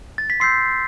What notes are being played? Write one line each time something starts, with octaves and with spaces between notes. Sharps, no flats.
A6
B6
C6 E6 G6 C7